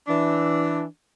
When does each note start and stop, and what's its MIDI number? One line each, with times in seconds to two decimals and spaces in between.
0.07 0.83 52
0.07 0.83 62